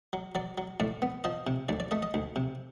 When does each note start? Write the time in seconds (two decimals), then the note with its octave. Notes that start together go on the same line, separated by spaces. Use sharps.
0.13 F#3
0.35 F#3 D5
0.58 F#3
0.80 A2 D5
1.02 B3
1.24 F3 D#5
1.47 C3
1.69 D2 D5
1.80 D5
1.91 A3 D#5
2.03 D#5
2.14 D2
2.36 C3